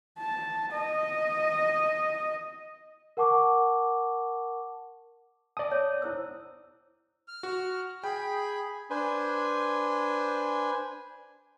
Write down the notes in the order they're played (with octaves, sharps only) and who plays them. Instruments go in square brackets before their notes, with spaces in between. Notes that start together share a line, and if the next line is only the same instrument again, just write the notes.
[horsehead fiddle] A5
D#5
[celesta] A#4 F#5 A5 C#6 D6
[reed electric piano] D5 D#6 [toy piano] A5
[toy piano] C#5
E4 C5 E6
[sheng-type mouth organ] F6
[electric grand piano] F#4
[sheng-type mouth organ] G#4 B5 [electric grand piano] G5
[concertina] D4 B4 C5 G#5